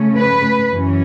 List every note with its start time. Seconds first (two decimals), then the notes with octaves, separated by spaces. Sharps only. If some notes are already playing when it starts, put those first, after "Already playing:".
Already playing: C#3 A3 C#4
0.14 B4
0.71 F#2 E3 C#4